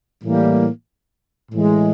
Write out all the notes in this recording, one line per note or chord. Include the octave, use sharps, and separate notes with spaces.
A2 E3 G3 A#3
A2 E3 G#3